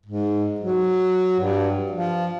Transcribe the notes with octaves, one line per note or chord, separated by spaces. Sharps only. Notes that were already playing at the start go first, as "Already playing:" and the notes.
G#2
F#3
G2
F3